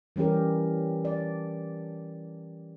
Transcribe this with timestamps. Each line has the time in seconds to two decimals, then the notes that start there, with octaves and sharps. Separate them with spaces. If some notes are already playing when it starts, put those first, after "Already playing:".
0.16 E3 G3 C#4 G4 A#4
1.05 D5